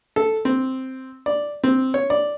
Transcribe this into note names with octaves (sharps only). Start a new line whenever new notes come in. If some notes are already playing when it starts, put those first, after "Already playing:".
A4
C4
D5
C4
C#5
D5